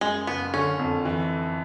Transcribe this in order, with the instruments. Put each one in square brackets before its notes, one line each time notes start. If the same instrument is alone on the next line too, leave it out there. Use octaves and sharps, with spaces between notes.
[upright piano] F#2 [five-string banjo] G#3
[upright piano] F#1 [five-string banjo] B3
[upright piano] D3 [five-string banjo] C#4
[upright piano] F2
E3